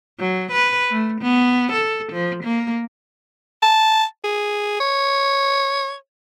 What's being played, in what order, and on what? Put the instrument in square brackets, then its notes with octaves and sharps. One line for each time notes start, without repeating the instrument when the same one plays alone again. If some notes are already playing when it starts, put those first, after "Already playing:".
[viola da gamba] F#3
B4
A3
B3
A4
F3
A#3
[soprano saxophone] A5
G#4
C#5